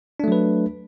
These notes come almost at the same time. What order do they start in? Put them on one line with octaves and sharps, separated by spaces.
D4 A3 F#3 B4